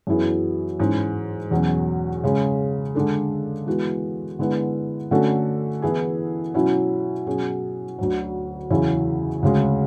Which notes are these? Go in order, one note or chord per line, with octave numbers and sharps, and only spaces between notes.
F#2 E3 B3 E4 G#4
G#2 E3 G#3 C#4
E2 B2 F#3 C#4
C#3 G#3 C#4
D3 G#3 D4 A4
E3 G#3 B3 F#4
D3 G#3 B3 E4
D3 A3 C#4 F#4 A4
E3 B3 E4 G#4
B2 F#3 C#4 E4
B2 F#3 C#4 G#4
D2 D3 F#3
E2 C#3 F#3 C#4 E4
D2 C#3 G#3